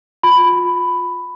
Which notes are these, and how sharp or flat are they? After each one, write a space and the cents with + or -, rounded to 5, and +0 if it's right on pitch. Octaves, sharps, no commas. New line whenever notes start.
F4 +25 B5 +10